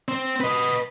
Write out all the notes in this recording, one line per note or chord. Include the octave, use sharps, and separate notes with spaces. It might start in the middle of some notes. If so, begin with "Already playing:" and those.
C4
B4 D#5